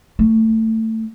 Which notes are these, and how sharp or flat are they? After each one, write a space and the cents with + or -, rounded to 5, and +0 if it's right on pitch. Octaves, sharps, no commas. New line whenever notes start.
A3 +20